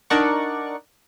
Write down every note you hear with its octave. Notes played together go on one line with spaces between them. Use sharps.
D4 D#4 A#4 D5 F#5 C#6